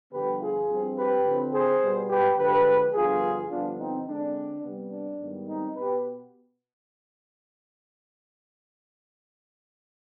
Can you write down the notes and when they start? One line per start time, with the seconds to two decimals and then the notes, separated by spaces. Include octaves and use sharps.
0.11 G2 D3 F3 B3 G4 B4
0.39 F4 G#4
0.67 G2 F3 C4
0.96 G4 B4
1.24 D3 F3 C4
1.52 G#4 C5
1.81 B2 G3 B3
2.08 G4 B4
2.36 D3 F3 G#3 G4 B4
2.93 G2 D3 F3 B3 F4 G#4
3.49 G2 D3 F3 B3 D4 F4
3.78 C4 D#4
4.06 D3 G#3 C4 D4
4.62 C3 G3 B3
4.91 D4
5.18 G#2 D#3 G3 B3
5.47 C4 D#4
5.75 B2 B3 G4 B4